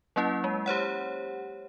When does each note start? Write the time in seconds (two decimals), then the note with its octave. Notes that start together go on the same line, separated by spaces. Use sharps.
0.16 F#3 A#3 C#4 E4
0.44 G#3
0.66 G4 C5 C#5 F#5